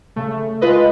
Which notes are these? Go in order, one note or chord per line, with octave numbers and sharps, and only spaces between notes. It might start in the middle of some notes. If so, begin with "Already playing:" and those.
C#3 A3
G#3 F4 B4 D#5